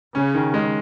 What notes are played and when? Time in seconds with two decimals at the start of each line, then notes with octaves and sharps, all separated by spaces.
0.15 C#3 C#4
0.35 D#3
0.54 G#3